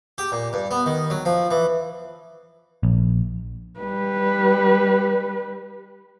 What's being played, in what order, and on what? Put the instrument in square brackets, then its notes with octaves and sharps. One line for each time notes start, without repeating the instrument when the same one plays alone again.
[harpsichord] G4
A#2
G2
B3
D#3
F#3
F3
E3
[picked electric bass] A#1
[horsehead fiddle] G3 B4